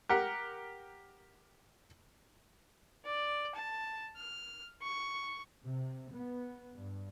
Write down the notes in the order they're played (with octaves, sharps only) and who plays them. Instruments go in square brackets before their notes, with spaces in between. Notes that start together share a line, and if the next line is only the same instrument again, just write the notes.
[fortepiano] G4 A#4 F#5
[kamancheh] D5
A5
F6
C#6
[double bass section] C3
B3
G2